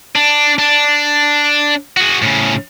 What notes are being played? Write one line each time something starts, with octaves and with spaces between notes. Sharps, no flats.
D4
D4
F#4 G#4
A2 C#3